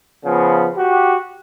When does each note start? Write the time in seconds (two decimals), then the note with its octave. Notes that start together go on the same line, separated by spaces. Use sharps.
0.25 C#3 F3 B3
0.76 F#4 G4